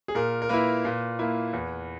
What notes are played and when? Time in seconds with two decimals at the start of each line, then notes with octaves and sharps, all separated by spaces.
0.08 G#4
0.15 A#2 A#4
0.42 A#4
0.49 A#3 E4 B4
0.85 A#2
1.19 A#3 E4
1.53 E2